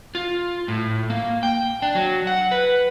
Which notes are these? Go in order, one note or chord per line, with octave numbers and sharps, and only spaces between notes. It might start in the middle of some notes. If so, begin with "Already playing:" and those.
F4
A2
A#3
G5
D4
F#3
F#5
B4